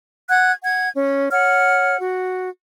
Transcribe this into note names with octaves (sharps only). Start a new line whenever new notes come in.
F#5 F#6 G#6
F#5 G#6
C#4
C#5 F#5 F6
F#4